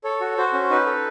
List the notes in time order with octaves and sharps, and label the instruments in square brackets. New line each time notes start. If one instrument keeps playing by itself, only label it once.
[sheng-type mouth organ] A4 C#5
F#4
F#4 C5
C#4
D#4 B4
A4